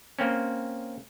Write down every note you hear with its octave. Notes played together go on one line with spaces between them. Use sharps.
A#3 C4 C#4